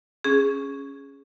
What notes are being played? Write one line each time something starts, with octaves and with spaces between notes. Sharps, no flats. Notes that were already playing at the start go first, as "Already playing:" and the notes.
C#4 G#4